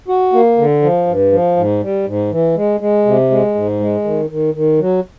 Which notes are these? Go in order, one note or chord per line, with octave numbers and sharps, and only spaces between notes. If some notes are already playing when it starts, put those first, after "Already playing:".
F#4
A#3
D3
F3
G2
F3
G#2
G3
G#2
E3
G#3
G#3
C3
G#3
G#2
G#3
D#3
D#3
D#3
F#3